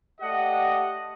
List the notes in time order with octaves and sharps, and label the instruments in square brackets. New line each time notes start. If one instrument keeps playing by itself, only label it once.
[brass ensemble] A3 G4 D5 D#5 F#5